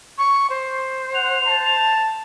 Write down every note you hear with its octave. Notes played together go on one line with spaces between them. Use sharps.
C#6
C5
F#5 F7
A5